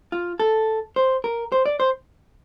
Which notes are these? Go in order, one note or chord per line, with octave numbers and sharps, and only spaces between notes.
F4
A4
C5
A#4
C5
D5
C5